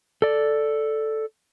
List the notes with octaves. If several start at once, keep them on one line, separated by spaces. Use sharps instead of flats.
A4 D5